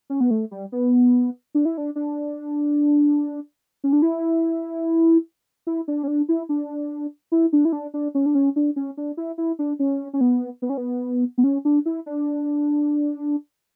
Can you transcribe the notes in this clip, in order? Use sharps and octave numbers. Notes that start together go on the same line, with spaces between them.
C#4
B3
A3
G3
B3
D4
E4
D4
D4
C#4
D4
E4
E4
D4
C#4
D4
E4
D4
E4
D4
E4
D4
D4
C#4
D4
C#4
D4
C#4
D4
E4
E4
D4
C#4
C#4
B3
B3
C#4
B3
B3
C#4
D4
E4
D4